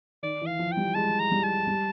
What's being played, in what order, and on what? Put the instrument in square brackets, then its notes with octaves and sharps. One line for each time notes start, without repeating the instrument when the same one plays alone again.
[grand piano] D#3 [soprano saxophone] D5
[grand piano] E3
[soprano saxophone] F5
[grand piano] F3
[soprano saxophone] G5
[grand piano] G3
[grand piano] G#3 [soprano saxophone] A5
[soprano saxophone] A#5
[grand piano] G3
[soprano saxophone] A5
[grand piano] G3